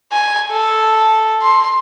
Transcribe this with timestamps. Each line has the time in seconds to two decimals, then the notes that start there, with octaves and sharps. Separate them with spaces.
0.12 G#5
0.52 A4
1.42 C6